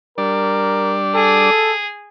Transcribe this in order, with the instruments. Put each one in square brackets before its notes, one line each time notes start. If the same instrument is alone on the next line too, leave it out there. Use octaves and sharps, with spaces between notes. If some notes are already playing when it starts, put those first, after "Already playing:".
[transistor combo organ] G3 D4 D5 [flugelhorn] A#4
[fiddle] G#4 [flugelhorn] A4